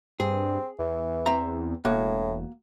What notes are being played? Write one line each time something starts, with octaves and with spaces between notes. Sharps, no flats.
G2 C4 G#4
E2 E3
C4 E5 A#5
E1 A2 A#3 F#4